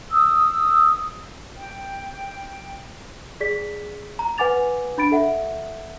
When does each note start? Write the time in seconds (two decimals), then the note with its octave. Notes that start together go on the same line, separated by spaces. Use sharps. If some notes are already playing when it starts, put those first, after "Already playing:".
0.11 D#6 E6
1.57 G5
3.41 G#4 D5 B6
4.19 A#5
4.38 B4 F#5 G#5 D6 A6 F7
4.98 D4 B5 A6 D7
5.12 A4 E5 F#5